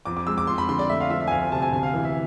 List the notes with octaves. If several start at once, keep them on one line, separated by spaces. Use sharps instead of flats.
F2 D6
D6
G#3 E6
D6
F2 C6
B5
D3 C6
D5
A3 E5
F5
F3 E5
E5
G#5
D2 F5
C3 A5
G#5
D2 G#5
F5
E3
E5